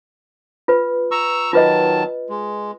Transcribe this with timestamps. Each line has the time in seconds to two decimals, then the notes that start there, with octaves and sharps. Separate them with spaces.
0.68 F4 B4
1.11 A#5 C#6 E6
1.53 D#3 F#3 F4 B4 D#5 A5
2.29 G#3